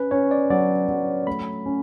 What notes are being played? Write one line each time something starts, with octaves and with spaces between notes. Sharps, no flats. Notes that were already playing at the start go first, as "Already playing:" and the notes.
Already playing: C#4 B4
C#4 C#5
D5
F#3 D5
F#3
A3 B5
C#4